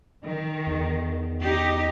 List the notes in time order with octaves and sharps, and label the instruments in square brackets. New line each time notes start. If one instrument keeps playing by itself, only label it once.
[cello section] D#3
[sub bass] E2
[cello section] D#4 G4